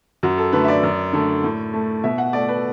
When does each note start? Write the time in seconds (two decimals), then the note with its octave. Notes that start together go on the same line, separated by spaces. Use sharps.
0.23 F#2 F#4
0.38 A4
0.53 D3 A3 B4
0.64 E5
0.68 D5
0.83 F#2
1.13 D3 A3
1.43 A2
1.73 A3
2.04 B2 E5
2.18 F#5
2.33 A3 D5
2.49 B4